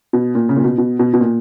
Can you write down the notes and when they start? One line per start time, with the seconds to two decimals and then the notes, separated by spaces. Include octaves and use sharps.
0.13 B2
0.35 A#2
0.49 C#3
0.56 A#2
0.64 B2
0.78 B2
0.99 B2
1.14 B2
1.21 A#2